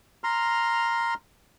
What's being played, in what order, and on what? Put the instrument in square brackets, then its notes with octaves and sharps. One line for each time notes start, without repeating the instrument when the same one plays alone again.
[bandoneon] A#5 C6 F6